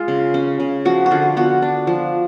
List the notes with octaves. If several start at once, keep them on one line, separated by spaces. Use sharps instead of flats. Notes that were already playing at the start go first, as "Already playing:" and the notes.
Already playing: G#3 F4
C#3
C#4
C#3
F3 F#4
F#4
D3 F4
B3 F#4
D4
F3